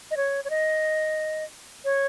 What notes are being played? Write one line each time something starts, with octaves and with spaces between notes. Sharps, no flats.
D#5
C#5
C#5
D#5
C#5